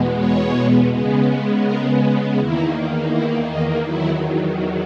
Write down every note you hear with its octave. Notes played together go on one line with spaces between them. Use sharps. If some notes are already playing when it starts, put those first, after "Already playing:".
Already playing: E2 B2 G#3 B3
C#5
C#3 G#3 B3
A#4
E2 D#3 A#3 E4
E4
D#4
E2 D#3 F#3 E4